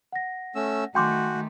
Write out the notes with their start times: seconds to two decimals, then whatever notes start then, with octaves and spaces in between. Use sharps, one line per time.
0.12 F#5 A#6
0.55 A3 C#4 E6
0.95 D#3 A3 F#4 G5 G#5 C6 D6 G6